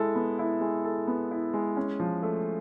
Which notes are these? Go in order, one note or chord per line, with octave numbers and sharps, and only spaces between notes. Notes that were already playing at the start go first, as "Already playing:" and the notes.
Already playing: G#3 E4 A4
B3
E4
G#3
A4
B3
E4
G#3
C#4
F3
A3